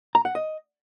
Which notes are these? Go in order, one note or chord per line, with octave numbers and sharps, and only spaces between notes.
A#5
F#5
D#5